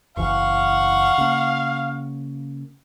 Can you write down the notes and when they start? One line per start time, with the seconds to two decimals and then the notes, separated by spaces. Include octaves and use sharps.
0.17 F#1 E2 E3 F5 F#5 C#6
1.18 C#3 A#3